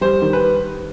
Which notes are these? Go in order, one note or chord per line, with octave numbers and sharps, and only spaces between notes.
G3 C5
D#3
B4